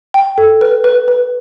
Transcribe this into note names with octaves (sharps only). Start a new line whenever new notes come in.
G5
A4
B4
B4
B4